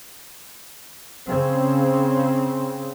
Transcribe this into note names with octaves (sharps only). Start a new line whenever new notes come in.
C#3 C4